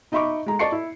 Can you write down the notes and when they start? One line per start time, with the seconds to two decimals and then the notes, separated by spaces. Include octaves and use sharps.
0.12 D#4 D#5 E5 B5 C#6 D6
0.46 G#3 A#5
0.59 D5 D#5 A5 C#6 C7 C#7
0.72 E4